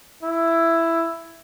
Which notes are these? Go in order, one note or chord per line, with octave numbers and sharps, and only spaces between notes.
E4